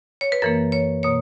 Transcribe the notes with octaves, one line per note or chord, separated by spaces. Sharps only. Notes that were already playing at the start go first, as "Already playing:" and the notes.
C#5
B4
F#2 E3 A#3 A#4
C#5
B2 A#3 C#5